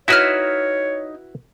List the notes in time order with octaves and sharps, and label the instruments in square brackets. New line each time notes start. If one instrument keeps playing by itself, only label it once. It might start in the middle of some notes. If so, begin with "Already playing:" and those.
[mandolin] D#4 E6 F6 [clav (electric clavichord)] E4 F#4 B4 [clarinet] C#5